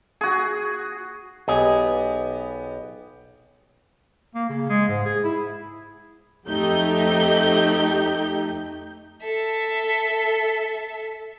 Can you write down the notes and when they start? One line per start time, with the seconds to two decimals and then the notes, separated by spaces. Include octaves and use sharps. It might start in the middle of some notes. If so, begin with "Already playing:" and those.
0.21 F#4 G#4
1.48 B1 B3 G4 G#4 D#5
4.35 A#3
4.50 C#3
4.70 G#3
4.89 G#2
5.05 G#4
5.24 E4
6.46 F2 A3 D#4 G4 G6
9.24 A4 E5